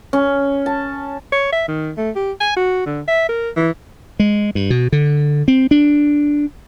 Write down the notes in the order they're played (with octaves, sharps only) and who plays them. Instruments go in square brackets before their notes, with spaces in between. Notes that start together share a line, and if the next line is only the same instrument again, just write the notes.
[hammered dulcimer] C#4
A5
[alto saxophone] C#5
E5
D#3
A3
G4
G#5
F#4
D3
E5
A#4
E3
[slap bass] G#3
G2
B2
D3
C4
D4